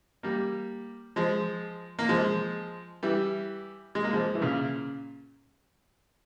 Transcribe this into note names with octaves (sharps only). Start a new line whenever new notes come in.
G3 A#3
F3 G#3
A#3
F3 G#3
E3 G3
G#3
A#3
F3 G#3
E3
A#2 C#3